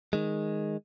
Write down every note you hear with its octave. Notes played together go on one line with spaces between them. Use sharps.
D#3 G#3